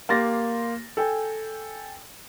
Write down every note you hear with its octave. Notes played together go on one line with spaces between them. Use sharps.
A#3 G4 C6 A6 A#6
A4 G5 G#5